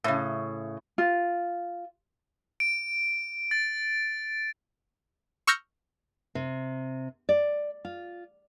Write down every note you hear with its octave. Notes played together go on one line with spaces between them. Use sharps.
A2 C#3
F4
D7
A6
C#6 E6 F6 G6 A#6 C#7
C3
D5
F4